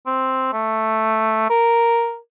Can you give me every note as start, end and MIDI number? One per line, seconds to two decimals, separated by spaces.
0.06 0.52 60
0.53 1.49 57
1.50 2.18 70